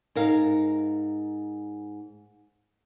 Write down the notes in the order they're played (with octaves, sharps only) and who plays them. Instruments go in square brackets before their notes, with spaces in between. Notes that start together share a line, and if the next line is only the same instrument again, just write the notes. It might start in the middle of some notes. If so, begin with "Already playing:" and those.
[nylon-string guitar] G#2 A#4 F5